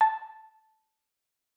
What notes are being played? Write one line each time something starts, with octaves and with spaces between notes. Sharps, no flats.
A5